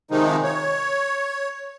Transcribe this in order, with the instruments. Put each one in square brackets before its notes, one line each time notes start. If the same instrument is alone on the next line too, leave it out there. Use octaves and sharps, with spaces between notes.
[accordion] C3 D#3 F3 G#3 D#4
C#5